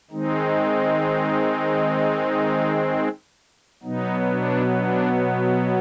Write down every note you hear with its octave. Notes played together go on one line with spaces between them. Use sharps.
D#3 G#3 C4 D#4
B2 F#3 B3 D#4
D4
D4